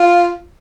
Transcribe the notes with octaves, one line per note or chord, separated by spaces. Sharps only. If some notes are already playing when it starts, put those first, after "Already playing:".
Already playing: F4